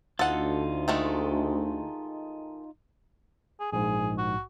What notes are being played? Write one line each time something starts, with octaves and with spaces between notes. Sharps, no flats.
D2 D#4 F4 A4 F#5
D#3 G#3 A3
G#4
A#1 G#2 G#4
F#4